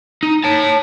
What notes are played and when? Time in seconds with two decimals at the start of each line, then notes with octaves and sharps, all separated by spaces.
0.23 D#4
0.44 C#5 A5